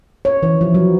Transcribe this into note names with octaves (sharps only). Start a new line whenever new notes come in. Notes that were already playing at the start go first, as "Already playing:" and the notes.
C#5
E3
F3
F#3